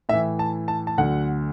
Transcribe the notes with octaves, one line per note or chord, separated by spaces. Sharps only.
A2 E3 E5
A5
A5
A5
D2 D3 F#3 F#5